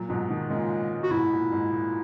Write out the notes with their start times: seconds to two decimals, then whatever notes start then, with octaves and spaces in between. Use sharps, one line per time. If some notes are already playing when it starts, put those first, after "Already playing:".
Already playing: A#2 F#3
0.09 G#2 B2
0.29 B2 D#3
0.49 A#2 C#3 G#3
1.03 F#4
1.11 G#2 B2 E4
1.32 A#2
1.52 G#2
1.73 A#2